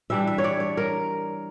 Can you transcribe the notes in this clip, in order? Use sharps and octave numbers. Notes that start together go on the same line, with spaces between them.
E3 G3 D4 E5
E5
C#5
D5
C#5
A#4